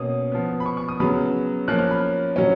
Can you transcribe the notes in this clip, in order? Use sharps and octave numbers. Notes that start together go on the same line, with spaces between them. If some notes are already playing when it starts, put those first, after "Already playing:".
Already playing: B2 A#3 C#4 D#6
F3 B3
B5
C#6
C#6
D#6
C#3 F#3 B3 B5
F3 A#3 C#4 F#6
F6
B5
F#3 C#4